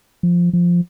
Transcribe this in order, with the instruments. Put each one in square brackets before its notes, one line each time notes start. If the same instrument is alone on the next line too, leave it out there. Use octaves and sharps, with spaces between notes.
[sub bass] F3
F3